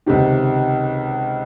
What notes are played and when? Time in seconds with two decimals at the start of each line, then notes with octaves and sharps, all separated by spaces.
0.06 C#2 C3 D#3